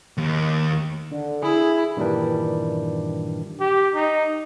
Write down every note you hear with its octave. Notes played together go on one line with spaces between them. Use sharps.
D#2
D3
E4 G#4
G2 A#2 D#3 E3 G3 D4
G4
D#4